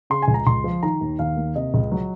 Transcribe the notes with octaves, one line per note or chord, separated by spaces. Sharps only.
C#3 C6
G#5
C#2
A#5
C#2 C6
F3
D#3 A#5
D#2
D#2 F5
A#3
C3 D#5
C#2
F#3